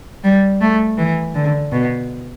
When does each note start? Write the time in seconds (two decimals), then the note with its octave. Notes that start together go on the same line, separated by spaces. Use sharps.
0.24 G3
0.61 A3
0.98 E3
1.35 D3
1.72 B2